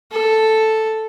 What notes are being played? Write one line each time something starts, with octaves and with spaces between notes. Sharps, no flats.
A4